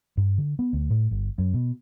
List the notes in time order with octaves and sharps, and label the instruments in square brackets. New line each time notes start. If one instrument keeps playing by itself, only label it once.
[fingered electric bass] G2
D3
B3
D2
A2
G1
F#2
B2